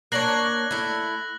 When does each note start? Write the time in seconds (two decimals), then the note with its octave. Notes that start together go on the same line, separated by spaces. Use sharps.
0.12 A#3 D4 C#5 F#6 A#6 F#7
0.71 A3 E4